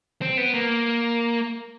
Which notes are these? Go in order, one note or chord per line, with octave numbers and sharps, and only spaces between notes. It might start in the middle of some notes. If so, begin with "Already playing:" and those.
C4
B3
A#3